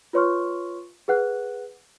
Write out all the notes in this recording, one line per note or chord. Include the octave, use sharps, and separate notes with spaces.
F4 B4 C#5 C6 C#6 F6
G#4 B4 F#5 F#6